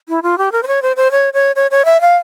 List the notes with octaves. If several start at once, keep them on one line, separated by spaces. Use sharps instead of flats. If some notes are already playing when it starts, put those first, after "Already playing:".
E4
F4
G4
A#4
C5
C#5
C5
C5
C#5
C#5
C#5
C#5
E5
F5